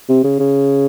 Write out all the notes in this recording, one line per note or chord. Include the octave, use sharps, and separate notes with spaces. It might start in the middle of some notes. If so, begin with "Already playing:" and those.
C3
C#3
C#3